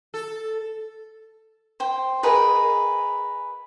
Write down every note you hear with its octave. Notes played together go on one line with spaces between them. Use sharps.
A4
C5 G5
G#4 A#4 B4 D#5